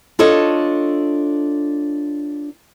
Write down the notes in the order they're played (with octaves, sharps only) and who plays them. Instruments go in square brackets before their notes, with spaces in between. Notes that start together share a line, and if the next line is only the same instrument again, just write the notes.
[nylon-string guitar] D4 F4 A4 C#5 D#5